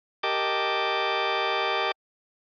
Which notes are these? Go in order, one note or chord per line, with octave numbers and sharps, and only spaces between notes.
G4 A#4 D#5 G5 A5 D6